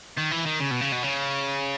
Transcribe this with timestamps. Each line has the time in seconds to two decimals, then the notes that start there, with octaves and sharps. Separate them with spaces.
0.17 D#3
0.31 E3
0.46 D#3
0.60 C#3
0.71 B2
0.81 C#3
0.92 B2
1.03 C#3